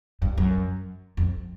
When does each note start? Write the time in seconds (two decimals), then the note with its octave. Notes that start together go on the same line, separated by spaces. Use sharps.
0.22 G2
0.38 F#2
1.17 F2